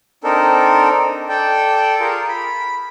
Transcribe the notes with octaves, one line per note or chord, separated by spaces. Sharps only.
C4 D4 D#4 A4 A#4
A4 D5 G5
F4 G#4 A#4
B5